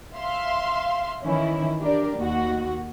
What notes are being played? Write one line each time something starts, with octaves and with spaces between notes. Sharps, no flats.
E5 F5 C6
D#3 E3 C#4 E4
D4 G4 A#4 D5
D#2 F#4